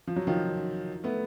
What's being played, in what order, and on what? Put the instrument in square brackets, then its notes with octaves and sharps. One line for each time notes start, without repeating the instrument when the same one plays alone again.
[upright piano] F3
F#3
D#3 F3
A3 B3